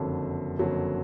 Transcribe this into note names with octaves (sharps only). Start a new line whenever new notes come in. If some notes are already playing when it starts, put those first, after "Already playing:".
Already playing: F#1 F2 D3 F#3
F#1 F2 D3 F#3